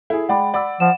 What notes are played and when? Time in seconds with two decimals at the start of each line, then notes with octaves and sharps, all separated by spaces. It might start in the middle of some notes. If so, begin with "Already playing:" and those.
0.10 E4 G#4 A4
0.29 G#3 D5 F#5 G5 B5
0.54 D5 F#5 B5 E6
0.80 F3 F#5 E7